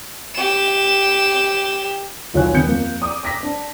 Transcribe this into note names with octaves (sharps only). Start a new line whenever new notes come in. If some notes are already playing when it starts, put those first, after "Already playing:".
G4 E7
D#1 B1 F4 C#5 G#5 F#6
D#1 D#3 B3 G6 C#7
F2 A#3
D5 D6 D#6
D6 A#6 B6
D4